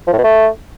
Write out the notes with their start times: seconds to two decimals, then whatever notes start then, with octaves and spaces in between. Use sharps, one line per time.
0.07 F3
0.13 A2
0.18 B2
0.24 A3